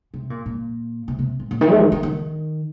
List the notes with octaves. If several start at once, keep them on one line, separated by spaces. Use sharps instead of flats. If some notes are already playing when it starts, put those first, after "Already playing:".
C3
A#2
A#2
C3
C3
A#2
A#2
D#3
A3
D#3
D#3
D#3